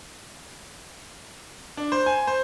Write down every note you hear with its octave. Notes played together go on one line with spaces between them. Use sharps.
D4
C5
G#5
C5